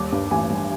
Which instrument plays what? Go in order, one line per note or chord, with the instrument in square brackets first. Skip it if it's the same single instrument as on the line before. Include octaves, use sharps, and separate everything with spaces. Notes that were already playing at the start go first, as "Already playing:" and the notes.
Already playing: [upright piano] D#2 G3 D6
G2
A1 G#5
G3